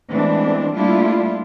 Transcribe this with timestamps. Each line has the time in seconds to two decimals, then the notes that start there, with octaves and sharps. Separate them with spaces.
0.11 E3 G#3 A3 B3 C4 D4
0.73 G3 A3 A#3 D4 E4 F4